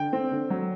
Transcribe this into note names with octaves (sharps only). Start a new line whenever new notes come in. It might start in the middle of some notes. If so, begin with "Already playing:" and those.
Already playing: D3 G5
C4
D3
F#3